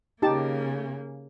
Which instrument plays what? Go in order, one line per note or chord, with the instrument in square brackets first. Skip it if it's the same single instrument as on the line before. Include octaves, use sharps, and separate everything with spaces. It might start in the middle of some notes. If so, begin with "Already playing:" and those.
[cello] C#3 A#3 [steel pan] D#4 G4 A5